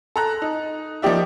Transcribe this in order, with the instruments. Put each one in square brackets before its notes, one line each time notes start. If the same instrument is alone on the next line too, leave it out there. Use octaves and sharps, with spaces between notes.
[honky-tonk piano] A4 A#5 F#6
D#4
F3 A#3 D#4 G4 D5 E5